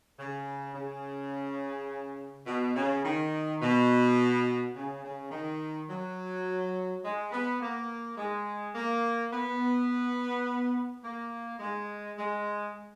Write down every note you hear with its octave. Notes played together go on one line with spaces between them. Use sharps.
C#3
C#3
B2
C#3
D#3
B2
C#3
C#3
D#3
F#3
G#3
B3
A#3
G#3
A#3
B3
A#3
G#3
G#3